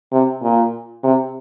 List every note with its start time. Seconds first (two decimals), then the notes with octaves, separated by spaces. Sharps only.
0.12 C3
0.42 A#2
1.03 C3